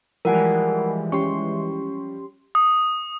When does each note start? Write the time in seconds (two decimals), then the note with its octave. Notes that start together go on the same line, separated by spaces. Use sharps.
0.25 E3 F3 G3 G#3 A#4 F#5 G#5
1.12 C#4 G4 C6 C#6
2.55 D#6